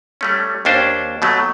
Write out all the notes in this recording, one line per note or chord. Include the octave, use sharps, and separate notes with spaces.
G3 A3 C#4
D#2 C#4 D4 C5
B2 F#3 A3